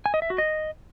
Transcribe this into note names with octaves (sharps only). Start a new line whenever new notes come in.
G#5
D#5
E5
F#4
D#5